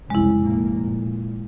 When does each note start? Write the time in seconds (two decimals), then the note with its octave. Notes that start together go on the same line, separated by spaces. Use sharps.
0.10 C2 F2 C#3 G#3 E4
0.41 F1 A#2 A#3
0.81 A#2